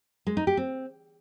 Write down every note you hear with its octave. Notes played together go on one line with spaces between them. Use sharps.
G#3
D#4
G4
C4